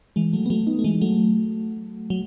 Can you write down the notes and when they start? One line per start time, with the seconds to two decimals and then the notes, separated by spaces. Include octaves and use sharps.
0.16 E3 G#3
0.33 F#3 A3
0.46 B3
0.50 F#3 A3
0.67 B3 D#4
0.79 A3
0.84 E3 G#3
1.01 F#3 A3
2.10 F#3